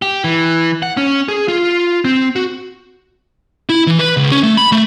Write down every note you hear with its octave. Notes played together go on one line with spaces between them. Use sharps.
G4
E3
F#5
C#4
G#4
F4
C4
F#4
E4
E3
B4
C#2
C#4
A3
B5
A3